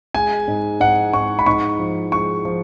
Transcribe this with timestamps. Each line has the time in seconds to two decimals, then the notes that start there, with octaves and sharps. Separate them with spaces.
0.14 G#3 G#5
0.48 G#2
0.80 G#2 F#5
1.13 G#2 C#6
1.39 B5
1.46 G#2 C#6
1.79 F3
2.12 G#3 C#6
2.45 F3